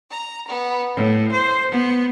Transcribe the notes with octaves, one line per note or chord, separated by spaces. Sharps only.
A#5
B3
A2
C5
B3